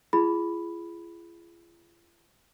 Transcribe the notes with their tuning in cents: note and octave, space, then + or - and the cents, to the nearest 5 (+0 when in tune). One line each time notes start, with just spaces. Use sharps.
F4 -45 G#4 +0 B5 +0